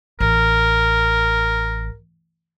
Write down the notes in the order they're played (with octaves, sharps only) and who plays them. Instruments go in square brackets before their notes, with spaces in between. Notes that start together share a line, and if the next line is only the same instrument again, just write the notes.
[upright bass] A1 [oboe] A#4